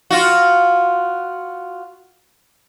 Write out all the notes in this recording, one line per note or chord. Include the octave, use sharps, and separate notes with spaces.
F4 F#4